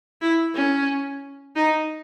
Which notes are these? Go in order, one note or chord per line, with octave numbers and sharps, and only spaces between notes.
E4
C#4
D#4